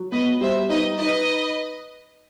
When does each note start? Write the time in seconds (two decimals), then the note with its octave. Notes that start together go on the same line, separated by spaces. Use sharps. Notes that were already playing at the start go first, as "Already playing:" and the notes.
Already playing: F#3
0.12 B3 B4 D#5
0.41 G3 C5 E5
0.69 D#4 B4 D#5
0.98 D#4 B4 D#5